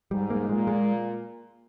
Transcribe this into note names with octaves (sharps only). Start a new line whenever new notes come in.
G#2 G3
A#3
A#2 G#3
G#3